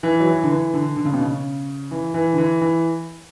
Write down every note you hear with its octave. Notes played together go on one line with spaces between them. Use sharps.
E3
F#3
E3
D3
E3
D3
D3
C#3
B2
C#3
E3
E3
D3
E3
E3